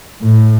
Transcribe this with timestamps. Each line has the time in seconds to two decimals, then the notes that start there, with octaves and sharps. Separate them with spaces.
0.23 A2